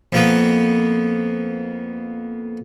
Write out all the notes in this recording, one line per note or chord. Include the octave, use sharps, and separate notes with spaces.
F2 A#3 B3